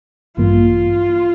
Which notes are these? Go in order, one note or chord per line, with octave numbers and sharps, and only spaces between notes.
A1 G2 E3 A#3 F4